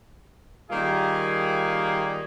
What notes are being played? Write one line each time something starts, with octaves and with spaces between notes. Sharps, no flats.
D#3 G3 A#3 F4 G#4